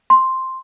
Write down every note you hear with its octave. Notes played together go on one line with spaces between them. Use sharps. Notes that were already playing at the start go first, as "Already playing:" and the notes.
C6